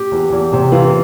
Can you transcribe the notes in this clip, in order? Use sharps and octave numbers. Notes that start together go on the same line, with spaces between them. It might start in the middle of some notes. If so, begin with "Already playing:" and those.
Already playing: G4
E2
E2
C3
E3 F4